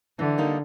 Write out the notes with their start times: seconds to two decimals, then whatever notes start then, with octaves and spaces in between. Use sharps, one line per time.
0.19 D3 E3
0.38 G3 A#3 D#4